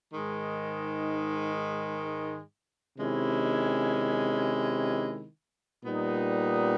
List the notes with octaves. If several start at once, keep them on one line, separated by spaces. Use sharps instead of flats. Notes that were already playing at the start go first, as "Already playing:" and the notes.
G#2 D#3 G#3
C3 D#3 G#3 C#4 E4
A#2 G3 B3 D#4